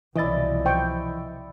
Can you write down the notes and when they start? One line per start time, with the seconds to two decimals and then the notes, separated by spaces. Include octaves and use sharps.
0.16 C2 B2 E3 F3 E4 D5 D#5 A6
0.65 C5 G5 C#6